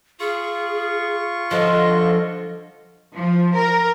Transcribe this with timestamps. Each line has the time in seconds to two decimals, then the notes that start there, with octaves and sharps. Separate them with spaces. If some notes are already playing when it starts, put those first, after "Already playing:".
0.20 F4 G#4 C#6
1.51 D3 F3 D#5
3.16 F3
3.53 A#4